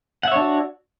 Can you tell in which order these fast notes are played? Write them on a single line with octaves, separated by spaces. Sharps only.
F#5 E5 C#5 D4 F#4